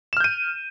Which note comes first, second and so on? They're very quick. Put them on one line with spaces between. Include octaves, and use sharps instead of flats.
E7 F6 G6 D#7